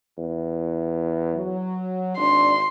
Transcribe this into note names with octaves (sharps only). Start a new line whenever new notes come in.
E2
F#3
G#1 D4 C6